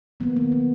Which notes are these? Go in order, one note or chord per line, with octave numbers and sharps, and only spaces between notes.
D#3 F#3 A#3 B3
B3
B3